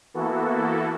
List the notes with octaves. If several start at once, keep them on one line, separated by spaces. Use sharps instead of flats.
E3 A#3 B3 E4 F#4 A4